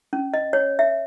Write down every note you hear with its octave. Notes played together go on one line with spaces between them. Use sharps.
C#4
D#5
C#5
E5